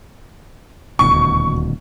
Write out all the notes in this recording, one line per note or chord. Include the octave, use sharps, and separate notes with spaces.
D#1 D2 B2 C#6